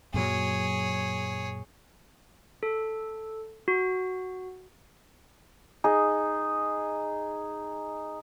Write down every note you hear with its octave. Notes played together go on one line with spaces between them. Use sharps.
F#2 A#2 F#3 G#4 C#5
A4
F#4
D#4 G#4